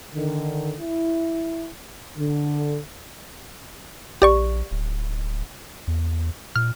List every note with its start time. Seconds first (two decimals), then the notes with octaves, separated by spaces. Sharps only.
0.14 D3 D#3
0.80 E4
2.17 D3
4.22 A#1 G4 D5 C#6
4.71 D1
5.87 E2
6.56 A#2 F6